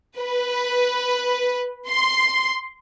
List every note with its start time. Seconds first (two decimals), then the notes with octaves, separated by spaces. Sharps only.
0.19 B4
1.89 C6